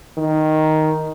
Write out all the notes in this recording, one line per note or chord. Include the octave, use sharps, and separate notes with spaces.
D#3